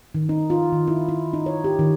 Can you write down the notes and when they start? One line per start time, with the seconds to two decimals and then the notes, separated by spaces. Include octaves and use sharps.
0.15 D#3
0.29 D#4
0.50 F4
0.73 D#3
0.88 E4
1.09 E4
1.33 D#4
1.46 C#5
1.64 G4
1.79 D#3